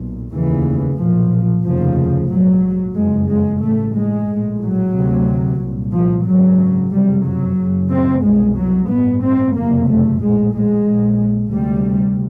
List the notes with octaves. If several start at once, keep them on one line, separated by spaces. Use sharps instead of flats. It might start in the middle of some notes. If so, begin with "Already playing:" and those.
Already playing: B1 A#2
F1 D#2 C#3 E3
B1 A#2 F3
F1 D#2 C#3 F3
A#1 G#2 F#3
F#1 F2 C#3 G#3
G#3
A1 G2 A3
G#3
A#1 A2
F#3
D2 C3
C2 A#2
F3
G#1 F#2 C#3 F#3
F#1 F2 C3 G3
F#3
F#1 F#2 C#3
C4
C2 B2 G#3
F#3
A1 G2 B3
C4
F#1 F2 C3 A#3
A3
A#1 A2 G#3
G#3
A#1 A#2
D2 C3 G3